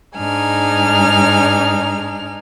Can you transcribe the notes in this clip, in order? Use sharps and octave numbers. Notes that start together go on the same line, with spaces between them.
G#2 D4 D#4 G#5 F6